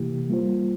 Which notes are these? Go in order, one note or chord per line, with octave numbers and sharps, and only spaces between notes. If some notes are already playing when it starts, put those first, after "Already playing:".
Already playing: C3 E3 A#3 E4 G4
G3 A#3 F4 C5